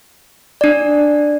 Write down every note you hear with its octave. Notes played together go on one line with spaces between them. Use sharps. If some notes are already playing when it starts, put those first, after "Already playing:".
D4 D5